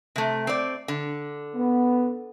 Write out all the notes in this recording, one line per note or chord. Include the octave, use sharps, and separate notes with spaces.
C3 A3
C4 D5
D3
B3